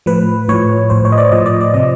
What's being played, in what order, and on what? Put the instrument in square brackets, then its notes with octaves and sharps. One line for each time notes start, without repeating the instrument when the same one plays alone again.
[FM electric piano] A2 F3 B4
A2 F3 C#5
A2 F3 C5
C#5
D#5
D5
A2 F3 D#5
D5
D5
C3 F3 D#5